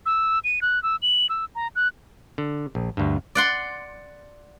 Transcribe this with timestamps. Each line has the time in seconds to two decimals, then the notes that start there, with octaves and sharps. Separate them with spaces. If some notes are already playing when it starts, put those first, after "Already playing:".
0.06 E6
0.44 D#7
0.62 F#6
0.83 E6
1.02 F#7
1.29 E6
1.55 A#5
1.75 F#6
2.38 D3
2.75 A#1
2.97 D2 G2
3.35 D5 F#5 C6